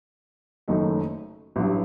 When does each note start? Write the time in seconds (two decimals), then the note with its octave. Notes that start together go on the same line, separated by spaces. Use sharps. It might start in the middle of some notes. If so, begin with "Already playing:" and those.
0.68 F#1 F#2 D#3 A3 D#4
1.56 A1 G2 F#3